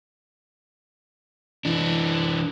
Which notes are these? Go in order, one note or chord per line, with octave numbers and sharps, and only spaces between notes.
E3 D4